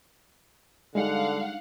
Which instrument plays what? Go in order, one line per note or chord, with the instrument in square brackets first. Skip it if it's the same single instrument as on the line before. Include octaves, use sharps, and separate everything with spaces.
[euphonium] D3 [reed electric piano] G3 G#3 [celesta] D4 D#4 C#7 [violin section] F5 F#5